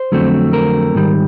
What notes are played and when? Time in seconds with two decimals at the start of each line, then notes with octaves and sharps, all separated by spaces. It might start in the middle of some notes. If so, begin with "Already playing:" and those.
Already playing: C5
0.12 F2 D3 F#3 A3 C4
0.53 A#4
0.95 G#2 D#3 G3